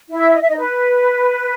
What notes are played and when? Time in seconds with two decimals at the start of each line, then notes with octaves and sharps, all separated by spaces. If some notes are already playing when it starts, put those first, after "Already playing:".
0.10 E4 E5
0.34 D#5
0.42 E5
0.49 D#4 D#5
0.57 B4